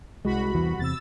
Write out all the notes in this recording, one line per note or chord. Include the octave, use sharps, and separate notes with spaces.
C2 G#3 F#4 B5
E2 E3
E2 C3 E6 A6